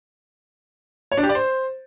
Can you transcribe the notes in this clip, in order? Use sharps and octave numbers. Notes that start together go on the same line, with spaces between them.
C#5
D4
G4
D5
C5